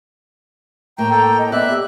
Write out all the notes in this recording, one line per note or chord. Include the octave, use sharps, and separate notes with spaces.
A2 A#3 G5 A#5
A4 G5
D#5
B3 D5 E5 F#6
G4